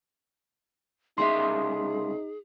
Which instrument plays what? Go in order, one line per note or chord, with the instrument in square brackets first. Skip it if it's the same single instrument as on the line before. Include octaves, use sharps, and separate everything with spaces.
[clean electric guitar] C2 C#3 E5 [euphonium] D#4 [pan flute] G#4 [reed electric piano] C6